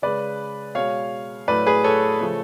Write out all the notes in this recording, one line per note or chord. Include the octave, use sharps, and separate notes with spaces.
C#3 G#3 B4 D5
B2 G#3 C#5 F5
A2 F#3 A3 B4 D5
G#4 B4
A4 C#5
C#3 F3 A3